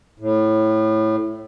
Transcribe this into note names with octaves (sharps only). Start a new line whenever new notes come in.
A2